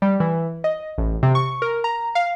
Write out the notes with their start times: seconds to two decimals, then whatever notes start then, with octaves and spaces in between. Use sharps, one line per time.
0.02 G3
0.20 E3
0.64 D#5
0.98 A1
1.23 C3
1.35 C#6
1.62 A#4
1.84 A#5
2.15 F5